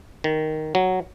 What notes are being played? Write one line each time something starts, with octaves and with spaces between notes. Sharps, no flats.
D#3
F#3